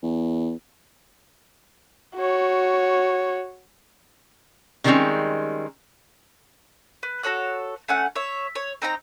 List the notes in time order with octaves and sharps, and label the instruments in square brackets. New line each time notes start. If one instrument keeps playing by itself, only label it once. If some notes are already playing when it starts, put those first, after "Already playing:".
[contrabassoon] E2
[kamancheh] F#4 C#5
[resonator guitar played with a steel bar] C3 D#3 G3 G#3 C4 C#4
[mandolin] B4
F#4 A4 C#5 F#6
A3 C#4 F#5
C#5 E5
C#5
C4 D#4 G5 A#5